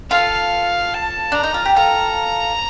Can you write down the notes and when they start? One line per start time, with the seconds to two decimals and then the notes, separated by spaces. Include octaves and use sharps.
0.10 F4 A4 F5
0.94 A5
1.32 D4 A#5
1.43 D#4
1.54 F4
1.65 G4
1.76 F4 A4 A#5